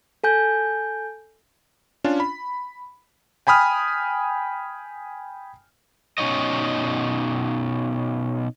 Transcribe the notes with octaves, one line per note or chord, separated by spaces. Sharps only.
A4 G#5 G6
C#4 D4 F4
B5
G5 G#5 B5 D#6 F6
B2 C#4 D#4 C#5 D#5